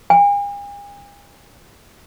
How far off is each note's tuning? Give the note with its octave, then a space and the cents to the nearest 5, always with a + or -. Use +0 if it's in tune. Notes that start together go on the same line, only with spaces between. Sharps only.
G#5 -45